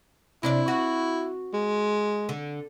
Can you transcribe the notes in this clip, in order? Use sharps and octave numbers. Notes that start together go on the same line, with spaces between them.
C3 D4 E4 D5
F#4
G#3
D3